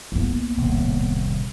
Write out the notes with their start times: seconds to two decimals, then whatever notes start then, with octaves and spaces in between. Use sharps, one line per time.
0.12 A#3 B3
0.57 D#1 C2 A2